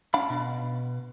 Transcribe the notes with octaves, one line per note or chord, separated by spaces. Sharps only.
C#4 D4 F5 F#5 B5
B2